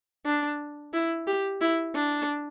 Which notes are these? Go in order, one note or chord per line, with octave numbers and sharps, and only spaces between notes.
D4
E4
G4
E4
D4